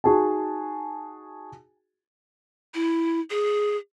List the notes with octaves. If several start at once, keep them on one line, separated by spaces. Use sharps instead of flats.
D#4 F#4 G#4 G#5 A5
E4
G#4